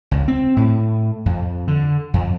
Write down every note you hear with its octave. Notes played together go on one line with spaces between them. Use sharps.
C#2
C4
A2
F2
D3
F2